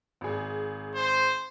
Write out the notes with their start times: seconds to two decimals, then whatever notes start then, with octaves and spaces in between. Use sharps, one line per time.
0.21 G#1 G#4
0.95 C5